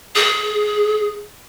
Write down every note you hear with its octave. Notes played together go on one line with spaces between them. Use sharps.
G#4